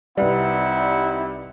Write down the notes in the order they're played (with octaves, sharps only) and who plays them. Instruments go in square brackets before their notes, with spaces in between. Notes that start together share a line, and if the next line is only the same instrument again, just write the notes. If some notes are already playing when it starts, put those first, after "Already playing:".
[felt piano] C2 B4 D5 [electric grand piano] G3 [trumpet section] C4 D#4 E4 [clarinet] F#5